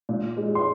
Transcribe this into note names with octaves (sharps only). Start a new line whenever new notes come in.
A#2
G#3
C6